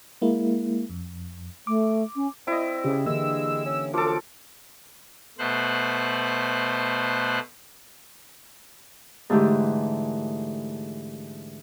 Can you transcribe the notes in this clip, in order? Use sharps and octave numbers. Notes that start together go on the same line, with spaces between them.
G#3 A#3 E4
F2
A3 D6
C#4
C4 E4 D5 D#5
C#3 G4
D3 E3 G#3 A#3 E6
C#4
F#2 F3 A4 D6
B2 A3 C5 F#6
G#2 D3 E3 A3 E4 G4